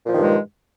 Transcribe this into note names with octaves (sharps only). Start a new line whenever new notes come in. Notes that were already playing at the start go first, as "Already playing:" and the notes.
G2 A#2 D#3 F3 G#3